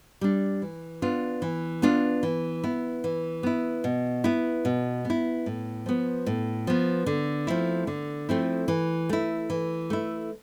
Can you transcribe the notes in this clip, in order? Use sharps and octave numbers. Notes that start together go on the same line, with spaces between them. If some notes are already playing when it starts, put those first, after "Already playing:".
G3 D4
E3
B3 D4 F4
E3
B3 D4 F4
E3
B3 E4
E3
B3 E4
B2
B3 E4
B2
B3
E4
A2
F3 B3
A2
F3 B3
D3
F3 A3 C4 E4
D3
F3 A3 C4 E4
E3
A3 E4
E3
A3 E4